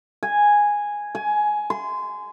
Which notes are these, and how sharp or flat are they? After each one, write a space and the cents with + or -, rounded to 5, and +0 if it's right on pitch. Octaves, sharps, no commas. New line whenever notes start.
G#5 -5
G#5 +15
C6 -25